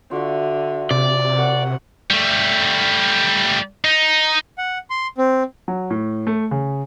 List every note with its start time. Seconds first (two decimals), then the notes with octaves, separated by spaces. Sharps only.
0.11 D3 F4 F#4 E5
0.91 C3 D5
1.38 A#4 C#5 F#5
2.10 G3 A3
3.84 D#4
4.58 F#5
4.90 C6
5.18 C4
5.68 F#3
5.90 A2
6.27 A3
6.51 C#3